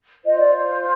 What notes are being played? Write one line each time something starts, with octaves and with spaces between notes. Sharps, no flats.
F4 C5 D#5
D5